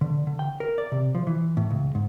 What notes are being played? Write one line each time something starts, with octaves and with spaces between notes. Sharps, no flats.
D3
D3
G5
A#4
D5
C3
F3
E3
A2
C#2
G#2